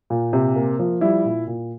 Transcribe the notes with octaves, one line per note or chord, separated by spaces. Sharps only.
A#2
C3
A#3
F3
G3 E4
A#2
A#2